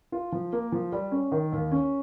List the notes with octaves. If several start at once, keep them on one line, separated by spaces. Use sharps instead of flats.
F4
F3
A#3
F3
G3
C#4
D#3
D#2
C#4